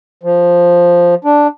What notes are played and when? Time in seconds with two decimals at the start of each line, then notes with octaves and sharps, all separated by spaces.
0.23 F3
1.25 D4